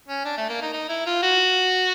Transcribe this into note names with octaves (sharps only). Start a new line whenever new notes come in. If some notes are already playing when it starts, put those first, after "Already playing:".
C#4
D4
A3
A#3
D#4
D#4
E4
F4
F#4